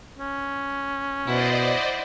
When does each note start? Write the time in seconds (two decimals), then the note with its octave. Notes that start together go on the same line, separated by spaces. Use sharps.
0.18 C#4
1.27 B2 E4 C5 D5 D#5 F#5